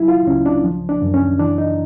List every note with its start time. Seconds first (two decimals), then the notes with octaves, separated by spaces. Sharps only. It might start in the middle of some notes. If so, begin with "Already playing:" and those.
Already playing: F#3 E4
0.08 F4
0.27 C#2 C#4
0.46 D4
0.64 F3
0.89 D4
1.02 F#2
1.14 C#4
1.39 E3 D4
1.58 D#4